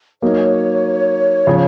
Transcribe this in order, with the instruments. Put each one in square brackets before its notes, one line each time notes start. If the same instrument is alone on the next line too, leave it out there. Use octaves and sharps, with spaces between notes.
[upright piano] F#3 A#3 D#4 [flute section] C#5
[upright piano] C#3 F3